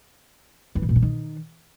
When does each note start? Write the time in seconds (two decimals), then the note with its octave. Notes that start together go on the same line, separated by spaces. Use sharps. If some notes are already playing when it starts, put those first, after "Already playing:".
0.75 E3
0.82 B2
0.89 A#2
0.96 C#3
1.02 D#3